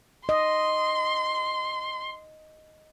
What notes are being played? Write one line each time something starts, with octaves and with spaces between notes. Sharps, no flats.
D#5 C6